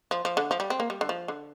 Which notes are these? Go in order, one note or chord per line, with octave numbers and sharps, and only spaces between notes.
F3
F3
D3
F3
G3
C4
A#3
G3
D3
F3
D3